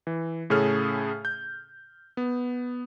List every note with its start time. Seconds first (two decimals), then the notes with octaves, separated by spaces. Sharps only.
0.07 E3
0.50 A2 C#3 C#4 G#4 A4 F6
1.25 G6
2.17 B3